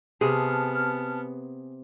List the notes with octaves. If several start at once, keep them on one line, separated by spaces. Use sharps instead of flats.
C3 B3 G#4 A5 F6